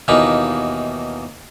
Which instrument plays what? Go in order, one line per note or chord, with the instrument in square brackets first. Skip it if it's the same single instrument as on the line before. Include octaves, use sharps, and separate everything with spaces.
[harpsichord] D#2 B2 E3 A#3 D#4 B5